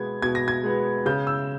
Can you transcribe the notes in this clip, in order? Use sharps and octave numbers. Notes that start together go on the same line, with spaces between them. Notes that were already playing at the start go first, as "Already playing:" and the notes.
Already playing: B2 G#3 B3 G#6
B2 G#6
A#6
G#6
G#3 B3
C#3 G6
E6